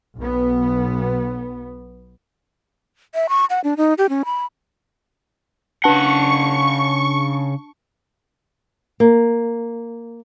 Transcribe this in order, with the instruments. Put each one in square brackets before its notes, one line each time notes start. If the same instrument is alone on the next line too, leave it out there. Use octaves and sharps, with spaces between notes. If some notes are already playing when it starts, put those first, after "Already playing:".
[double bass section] B1 B3
[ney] E5
C#6
F#5
D4
D#4
G4
C#4
B5
[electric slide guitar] C#3 F#5 [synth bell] D4 A5 [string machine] C#6
[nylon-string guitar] A#3